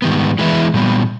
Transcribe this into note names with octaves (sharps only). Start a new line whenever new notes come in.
G#2 D#3 G3 B3
E3 G#3 B3 E4
A#2 G3 B3